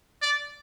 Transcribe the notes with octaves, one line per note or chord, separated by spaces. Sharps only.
D5